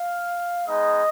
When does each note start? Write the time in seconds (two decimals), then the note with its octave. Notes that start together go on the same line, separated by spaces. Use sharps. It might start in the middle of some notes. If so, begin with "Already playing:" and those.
Already playing: F5
0.68 G#3 B3 D#4 D#5